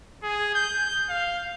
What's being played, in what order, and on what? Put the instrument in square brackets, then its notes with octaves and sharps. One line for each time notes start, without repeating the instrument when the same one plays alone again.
[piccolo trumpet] G#4
G6
F5